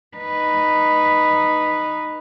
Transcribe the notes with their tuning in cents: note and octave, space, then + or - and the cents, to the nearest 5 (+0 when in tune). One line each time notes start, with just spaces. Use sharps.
D#4 -10 B4 +0